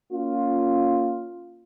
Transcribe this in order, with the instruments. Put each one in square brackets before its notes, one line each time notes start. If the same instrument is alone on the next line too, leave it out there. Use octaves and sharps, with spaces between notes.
[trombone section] A#3 C#4 F4